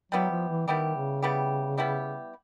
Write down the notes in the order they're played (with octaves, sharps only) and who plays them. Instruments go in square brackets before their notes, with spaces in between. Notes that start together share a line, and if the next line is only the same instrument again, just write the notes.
[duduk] F#3 [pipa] G3 B3 E4 G4
[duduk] F3
E3
[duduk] D#3 [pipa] G3 B3 E4 G4
[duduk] C#3
[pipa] G3 B3 E4 G4
G3 B3 E4 G4